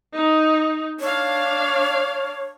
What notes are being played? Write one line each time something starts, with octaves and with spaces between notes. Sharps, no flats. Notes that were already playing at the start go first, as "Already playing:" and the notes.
D#4
D4 C#5 F5